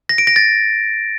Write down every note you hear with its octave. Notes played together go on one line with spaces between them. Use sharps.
A#6
D7
A#6
A6